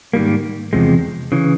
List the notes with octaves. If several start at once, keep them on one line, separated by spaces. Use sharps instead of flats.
G#2 D#3 G3 A#3
E2 C3 F3 G#3
C#3 E3